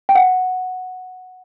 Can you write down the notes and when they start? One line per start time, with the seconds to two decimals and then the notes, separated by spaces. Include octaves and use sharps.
0.09 G5
0.15 F#5